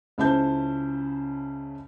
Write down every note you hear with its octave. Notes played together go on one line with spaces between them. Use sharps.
C#2 C#3 E4 C5 A5 G6